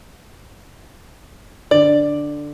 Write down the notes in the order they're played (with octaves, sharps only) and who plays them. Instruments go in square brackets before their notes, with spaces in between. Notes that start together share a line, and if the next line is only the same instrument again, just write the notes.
[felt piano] D3 [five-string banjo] D5